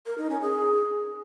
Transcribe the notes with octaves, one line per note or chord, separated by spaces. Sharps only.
A#4
D#4
C#4
G#4